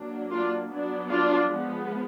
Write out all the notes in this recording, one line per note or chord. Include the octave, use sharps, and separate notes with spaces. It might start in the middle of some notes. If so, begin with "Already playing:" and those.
Already playing: F#3 A#3 D4
D4 F4
F#3 B3 D4
D4 F4
F3 G#3 B3